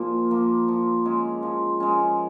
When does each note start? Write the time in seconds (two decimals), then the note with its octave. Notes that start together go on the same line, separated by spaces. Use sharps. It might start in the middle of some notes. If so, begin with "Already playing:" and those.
Already playing: A#2 F3 A#3
0.30 F3 A#3
0.68 F3
1.05 G#3 C#4
1.43 F3
1.80 G#3 C#4